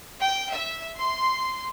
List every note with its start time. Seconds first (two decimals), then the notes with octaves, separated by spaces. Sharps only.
0.21 G5
0.52 E5
0.97 C6